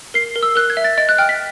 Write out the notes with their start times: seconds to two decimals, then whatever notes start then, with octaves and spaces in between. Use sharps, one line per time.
0.14 A#4 C7
0.35 A#4
0.43 E6
0.56 A#4 F#6
0.70 G#6
0.77 E5
0.84 A6
0.98 D#5 A6
1.09 F#6
1.18 G5 F6
1.29 B6